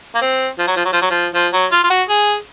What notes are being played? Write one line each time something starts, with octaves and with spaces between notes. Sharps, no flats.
A#3
C4
F3
F#3
F3
F#3
F3
F#3
F3
F3
F#3
F4
F4
F#4
G#4